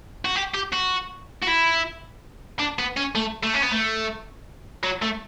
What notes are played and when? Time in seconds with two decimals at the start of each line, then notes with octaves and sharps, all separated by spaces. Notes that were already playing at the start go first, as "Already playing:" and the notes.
0.25 F#4
0.35 G4
0.54 G4
0.73 F#4
1.43 F#4
1.48 E4
2.59 D4
2.79 B3
2.97 C#4
3.15 A3
3.43 A3
3.54 C#4
3.63 B3
3.72 A3
4.84 F#3
5.02 A3